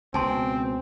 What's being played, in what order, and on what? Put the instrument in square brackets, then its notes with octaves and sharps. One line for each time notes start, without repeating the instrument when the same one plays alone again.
[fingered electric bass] C#2 B2 [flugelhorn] C4 [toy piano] G#5 A5 C6